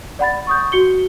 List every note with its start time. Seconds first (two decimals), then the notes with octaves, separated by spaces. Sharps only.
0.19 D5 F#5 B5 A6
0.47 C#6 D#6 G6
0.72 F#4 C#7 G7